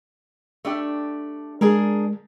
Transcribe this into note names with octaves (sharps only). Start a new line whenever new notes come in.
A3 D4 G4
G#3 D4 G#4 A#4